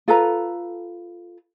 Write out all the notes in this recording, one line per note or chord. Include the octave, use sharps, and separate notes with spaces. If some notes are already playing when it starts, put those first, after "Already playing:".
F4 A4 B4 A#5